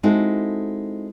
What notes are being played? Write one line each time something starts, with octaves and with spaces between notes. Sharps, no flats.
G#3 C4 D#4 E4 F#4 A4